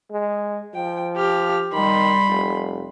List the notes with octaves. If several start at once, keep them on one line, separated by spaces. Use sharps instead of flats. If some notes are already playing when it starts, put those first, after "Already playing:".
G#3
F3 G5
G4 F6
D#3 G3 B5 C6
F1